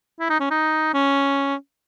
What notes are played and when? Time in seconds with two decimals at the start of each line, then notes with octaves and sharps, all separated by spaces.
0.20 E4
0.30 D#4
0.40 C#4
0.51 D#4
0.94 C#4